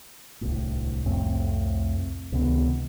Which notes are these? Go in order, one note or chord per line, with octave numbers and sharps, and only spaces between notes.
D1 C2 A2
C2 F2 A2 C4
C#2 C3 D#3 B3